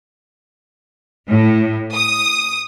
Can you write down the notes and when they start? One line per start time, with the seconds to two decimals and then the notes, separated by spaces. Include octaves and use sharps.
1.29 A2
1.93 D#6